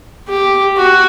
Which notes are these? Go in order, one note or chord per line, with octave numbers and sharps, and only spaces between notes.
G4
F#4